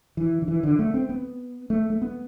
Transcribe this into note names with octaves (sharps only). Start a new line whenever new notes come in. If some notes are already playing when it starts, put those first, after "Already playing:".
E3
D3
E3
D3
A3
C4
B3
A3
A3
B3